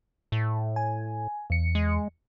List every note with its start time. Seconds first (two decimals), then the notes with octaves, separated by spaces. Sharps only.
0.32 A2
0.76 G#5
1.50 E2 C#7
1.75 G#3